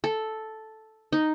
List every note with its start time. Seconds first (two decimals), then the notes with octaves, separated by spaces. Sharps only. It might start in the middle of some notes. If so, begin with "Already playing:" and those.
0.04 A4
1.13 D#4